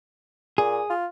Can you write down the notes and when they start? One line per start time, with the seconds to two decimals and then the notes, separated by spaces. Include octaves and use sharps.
0.58 A#2 G#4
0.90 F4